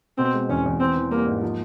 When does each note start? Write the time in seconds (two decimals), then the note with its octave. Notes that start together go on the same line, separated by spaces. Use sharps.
0.18 B2 C4
0.34 G#3
0.49 E2 C#4
0.65 E2
0.80 E3 C4
0.96 E3
1.11 G3 A#3
1.27 G#2
1.42 F3